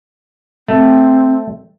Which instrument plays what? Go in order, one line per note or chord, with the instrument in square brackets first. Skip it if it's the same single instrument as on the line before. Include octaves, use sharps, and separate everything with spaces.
[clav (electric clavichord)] A3 [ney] C4